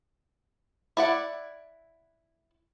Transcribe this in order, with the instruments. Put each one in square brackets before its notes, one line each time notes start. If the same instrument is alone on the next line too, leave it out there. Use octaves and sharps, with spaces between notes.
[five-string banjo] E4 D5 F#5